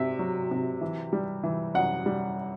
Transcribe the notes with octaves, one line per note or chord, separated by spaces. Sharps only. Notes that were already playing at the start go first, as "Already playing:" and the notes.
Already playing: C3 E5
F#3
C3
E3
G3
E3
F#2 F#5
G3